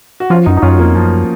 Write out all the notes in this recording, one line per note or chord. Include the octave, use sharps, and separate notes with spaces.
F#4
F3 C#4 F4
F#2 D#4 F#4
D#4
F#2 C#4 F4
F2 A#3 C#4
F#2 F3